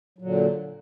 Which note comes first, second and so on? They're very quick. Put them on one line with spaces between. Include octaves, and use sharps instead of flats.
F#3 A#2 D3